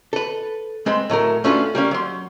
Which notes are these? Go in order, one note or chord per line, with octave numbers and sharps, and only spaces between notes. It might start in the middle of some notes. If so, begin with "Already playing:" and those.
A4 B4
G#3 C4 B4 C6
A2 F#3 A3 A#4
A3 C#4 D4 F4 F#4 B4
G3 A#3 C#4
F#3 C6